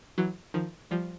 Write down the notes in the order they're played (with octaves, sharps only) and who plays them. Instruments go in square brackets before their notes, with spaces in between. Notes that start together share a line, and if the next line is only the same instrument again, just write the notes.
[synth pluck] E3 F#3
D#3 F3
F3 G3